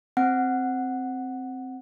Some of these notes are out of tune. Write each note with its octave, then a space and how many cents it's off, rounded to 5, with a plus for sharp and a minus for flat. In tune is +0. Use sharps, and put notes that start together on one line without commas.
C4 +0 F#5 +0